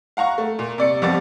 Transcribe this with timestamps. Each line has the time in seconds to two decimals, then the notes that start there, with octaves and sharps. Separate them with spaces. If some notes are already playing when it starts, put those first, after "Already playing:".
0.17 F5 F#5 A#5 C#6
0.38 A3
0.59 A#2
0.78 C3 D5 C#7
1.02 F2 F3 G3 B3 D6 A6